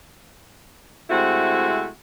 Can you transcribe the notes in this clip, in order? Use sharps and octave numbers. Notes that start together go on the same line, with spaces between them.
C3 G#3 A3 C4 E4 F#4